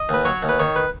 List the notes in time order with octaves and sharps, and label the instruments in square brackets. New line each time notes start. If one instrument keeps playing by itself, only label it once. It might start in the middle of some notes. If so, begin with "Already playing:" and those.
Already playing: [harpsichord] D#5
D#2 B4
F#3 C#5
D#2
B4
D#3 C#5
B4